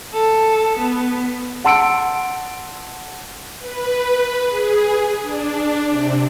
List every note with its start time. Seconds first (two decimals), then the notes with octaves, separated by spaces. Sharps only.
0.14 A4
0.79 B3
1.64 F#5 A5 C6 E6 C#7 D7
3.59 B4
4.48 G#4
5.21 D4
5.89 C3